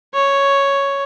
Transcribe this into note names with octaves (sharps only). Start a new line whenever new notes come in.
C#5